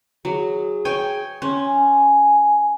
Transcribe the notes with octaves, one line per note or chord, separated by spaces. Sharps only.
F#3 G#4
C#5 G5 G#5
C#4 C6
G#5